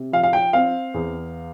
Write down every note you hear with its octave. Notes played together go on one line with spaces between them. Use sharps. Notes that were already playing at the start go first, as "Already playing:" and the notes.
Already playing: C3
F3 F5
F5
G5
C4 F5
E2